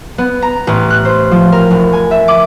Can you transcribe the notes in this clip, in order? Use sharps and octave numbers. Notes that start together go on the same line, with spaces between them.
B3
A#5
A1
F#6
C5
F3
A#4
F1
G#5
E5
D6